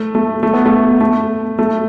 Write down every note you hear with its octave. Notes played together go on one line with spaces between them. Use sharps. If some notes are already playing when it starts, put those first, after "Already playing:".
Already playing: A3
A3
A3
B3
A3
A3
A3